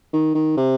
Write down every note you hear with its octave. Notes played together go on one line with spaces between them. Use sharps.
D#3
D#3
C3